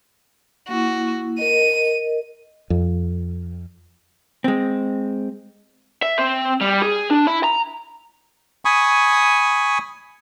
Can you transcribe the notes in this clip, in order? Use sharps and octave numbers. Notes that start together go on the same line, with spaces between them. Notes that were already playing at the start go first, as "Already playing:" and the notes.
A#3 E4 F#4
A#4 D#5 D#7
F2
G#3 C4
E5
C4
G3
G#4
D4
E4
A#5
G#5 B5 C#6 D#6